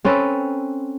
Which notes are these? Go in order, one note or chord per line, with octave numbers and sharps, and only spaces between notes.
C4 C#4 A4 B4